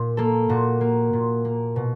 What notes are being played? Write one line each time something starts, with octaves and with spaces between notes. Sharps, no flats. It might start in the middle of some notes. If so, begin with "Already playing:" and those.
Already playing: A#2
A#3 A4
A#2 F#4
A#3
A#2
A#3
B2